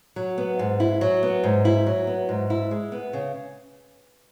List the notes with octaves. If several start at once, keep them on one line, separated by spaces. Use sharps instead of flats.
F#3
B3
G#2
E4
F#3
B3
G#2
E4
F#3
B3
G#2
E4
G#3
B3
C#3